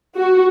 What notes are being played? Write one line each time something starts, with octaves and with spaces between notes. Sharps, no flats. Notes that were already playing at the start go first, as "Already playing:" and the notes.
F#4